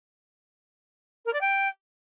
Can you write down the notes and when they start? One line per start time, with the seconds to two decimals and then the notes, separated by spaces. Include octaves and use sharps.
1.25 A#4
1.33 D5
1.41 G5